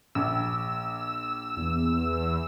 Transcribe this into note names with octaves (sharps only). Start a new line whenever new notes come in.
A#1 E6
E2